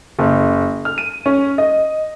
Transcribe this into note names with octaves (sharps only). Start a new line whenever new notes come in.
F#1
F6
D#7
C#4
D#5